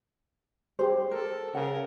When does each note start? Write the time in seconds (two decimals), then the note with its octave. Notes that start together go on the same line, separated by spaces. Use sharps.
0.79 G4 G#4 C5
1.11 A4 A#4
1.55 C#3 A#4 F#5